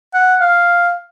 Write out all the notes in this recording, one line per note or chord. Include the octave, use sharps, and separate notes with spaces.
F#5
F5